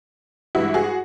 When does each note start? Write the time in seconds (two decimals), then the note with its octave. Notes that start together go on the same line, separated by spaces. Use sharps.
0.55 G2 E3 G#3 E4 F#4
0.74 F#4 G#4